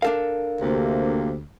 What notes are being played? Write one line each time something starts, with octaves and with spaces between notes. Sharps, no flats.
D4 A4 A#4 F5
D2 C3 A#3